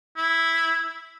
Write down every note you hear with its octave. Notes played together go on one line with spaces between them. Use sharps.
E4